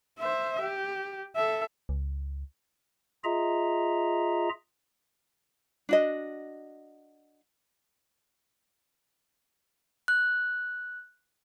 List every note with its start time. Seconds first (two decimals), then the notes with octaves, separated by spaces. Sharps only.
0.20 C5 E5
0.61 G4
1.36 A4 E5
1.89 C#2
3.24 F4 G#4 D#5 E5 A#5
5.89 D4 F#4 D#5
10.08 F#6